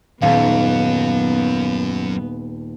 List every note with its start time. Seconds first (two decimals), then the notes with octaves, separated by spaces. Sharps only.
0.22 D#1 F#2 B3 F5 A5